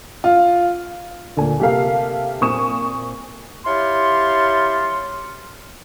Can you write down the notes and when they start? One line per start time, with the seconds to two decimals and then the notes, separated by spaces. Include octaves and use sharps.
0.24 F4
1.37 D2 A#2 G#5
1.60 C3 A#3 G4 A4 F5
2.41 A#2 C4 C#6 D#6 E7
3.67 E4 G4 C#5 F5 A5 C6